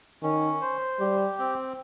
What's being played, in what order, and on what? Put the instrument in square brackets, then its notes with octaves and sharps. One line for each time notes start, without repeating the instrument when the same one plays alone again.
[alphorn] D#3 [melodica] C#4
[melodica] C5
[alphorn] G3 [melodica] G4
[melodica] C4